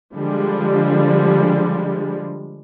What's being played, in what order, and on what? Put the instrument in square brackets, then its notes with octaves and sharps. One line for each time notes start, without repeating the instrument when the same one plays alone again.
[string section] D3 F3 G3 G#3